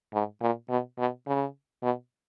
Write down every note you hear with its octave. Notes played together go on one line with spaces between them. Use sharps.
G#2
A#2
B2
B2
C#3
B2